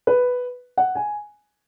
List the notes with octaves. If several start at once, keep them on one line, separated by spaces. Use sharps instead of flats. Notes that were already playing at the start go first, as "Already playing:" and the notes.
B4
F#5
G#5